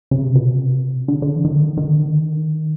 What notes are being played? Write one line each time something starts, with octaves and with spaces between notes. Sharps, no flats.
C#3
C3
B2
C3
D3
D3
E3
D#3
D3
D#3
D#3
D3
D#3